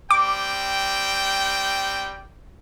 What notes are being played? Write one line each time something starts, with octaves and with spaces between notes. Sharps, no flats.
G3 C4 G5 D6